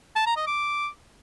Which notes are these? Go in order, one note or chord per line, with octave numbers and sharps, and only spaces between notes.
A5
A#5
D#5
D6